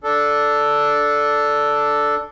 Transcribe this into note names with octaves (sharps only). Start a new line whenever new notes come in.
D4 A4